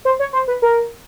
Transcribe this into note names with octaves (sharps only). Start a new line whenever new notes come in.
C5
C#5
C5
B4
A#4